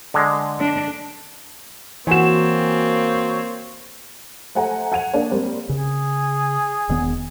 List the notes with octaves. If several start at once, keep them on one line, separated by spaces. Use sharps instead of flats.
D3 G#3
D4
E3 A#3 C4 F#4 C#5 G#5 E7
A3 C5 F#5 G#5 A#5
F#5 G#6 D#7 F7
A#3 D4 G#4 C#5 F5
G3 A#3 C4
C#3 G#4
E1 D#3 B3